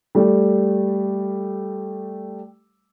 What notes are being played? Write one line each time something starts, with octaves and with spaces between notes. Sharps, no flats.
G3 A3